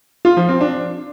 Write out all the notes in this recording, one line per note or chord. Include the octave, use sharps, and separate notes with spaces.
F4
F3
C4
D4